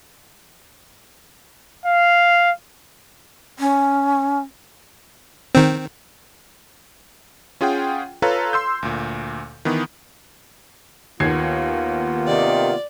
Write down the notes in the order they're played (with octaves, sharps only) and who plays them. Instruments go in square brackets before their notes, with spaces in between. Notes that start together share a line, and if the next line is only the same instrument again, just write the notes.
[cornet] F5
[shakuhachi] C#4
[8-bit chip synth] D#3 C4
[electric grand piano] C#4 F4 G#4 F#5 G5
F4 A4 B4 C#5 F5 A#5
C6 E6 G6
D2 A#2
D#3 E3 B3
[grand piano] D#2 G#6 C7 [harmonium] A#3 B3 F4
[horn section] C3 D#3 [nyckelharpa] D5